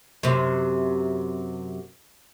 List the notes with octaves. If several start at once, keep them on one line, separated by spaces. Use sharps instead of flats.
F#2 C3